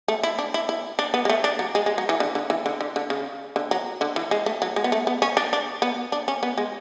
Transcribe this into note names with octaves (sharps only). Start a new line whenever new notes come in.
A3
E4
D4
E4
E4
D4
B3
G#3
A3
D4
F#3
G#3
G#3
F#3
E3
D3
D3
E3
D3
D3
D3
C#3
D3
F#3
D3
E3
G#3
A3
F#3
G#3
B3
A3
B3
C#4
D4
D4
B3
D4
C#4
B3
G#3